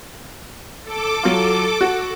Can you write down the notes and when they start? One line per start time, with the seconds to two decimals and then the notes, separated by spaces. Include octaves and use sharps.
0.83 A4 D6
1.23 F#3 F4
1.81 F#4